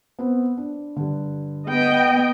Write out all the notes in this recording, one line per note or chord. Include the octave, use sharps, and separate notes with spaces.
B3 C4
D4
G2 D3
B3 D#5 G5